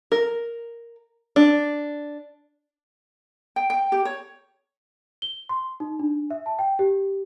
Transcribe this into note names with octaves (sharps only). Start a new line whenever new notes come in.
A#4
D4
G5
G5
G4
C#5
G7
C6
D#4
D4
E5
A5
G5
G4